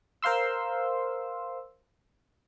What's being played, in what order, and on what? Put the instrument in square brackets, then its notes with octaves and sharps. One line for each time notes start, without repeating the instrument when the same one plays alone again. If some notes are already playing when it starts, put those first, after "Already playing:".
[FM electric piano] A#4 C5 F5 C6 E6